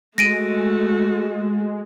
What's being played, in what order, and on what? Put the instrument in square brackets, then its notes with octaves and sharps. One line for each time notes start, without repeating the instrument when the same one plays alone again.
[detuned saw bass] G#3 [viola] A3 F#4 [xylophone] A#6 D7 D#7